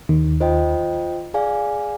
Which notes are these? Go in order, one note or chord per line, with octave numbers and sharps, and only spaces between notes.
D#2 D#3
F4 C5 D#5 G5
G#4 D5 F5 G#5